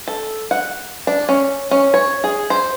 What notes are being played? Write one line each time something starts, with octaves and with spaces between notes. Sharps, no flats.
A4
F#5
D4
C#4
C#4
C#5
G#4
C5